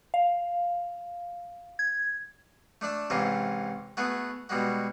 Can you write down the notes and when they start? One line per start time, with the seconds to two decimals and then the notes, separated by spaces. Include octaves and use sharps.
0.14 F5
1.79 G#6
2.81 A3 D4 D5 A5
3.10 G#2 C3 E3 C#4 F4
3.97 A3 B3 F#4 G#4
4.49 B2 G3 G#3 F#4